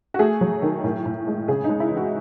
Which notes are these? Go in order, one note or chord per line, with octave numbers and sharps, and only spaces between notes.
F#4
A3 G#4
F#3
D#3
A2
A2
G#3
C#3 G#4
G#3 D#4
E4
E3
F#4